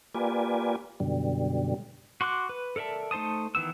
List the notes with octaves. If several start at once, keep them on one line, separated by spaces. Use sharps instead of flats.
A#3 F4 G4 B4 D5 G#5
F#2 B2 D3 G3
F#4 C6 D6 F#6
B4
A4 A#4 D5 E5 A5
A3 D#4 C5 A5 D#6
D#3 E3 B3 E6